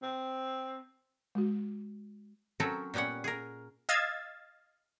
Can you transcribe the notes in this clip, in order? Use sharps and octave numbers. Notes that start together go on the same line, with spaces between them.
C4
G#3 F#4
F#3 C4 C#4 A4 A#4
A#2 G3 B3 C#4 F#5
G#4 A#4
D#5 F5 E6 G#6 A6